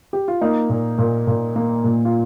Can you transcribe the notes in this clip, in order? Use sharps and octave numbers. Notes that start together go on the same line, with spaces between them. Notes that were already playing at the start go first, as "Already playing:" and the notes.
G4
F4
A#3 D#4
A#2
A#2
A#2
A#3
A#2
F4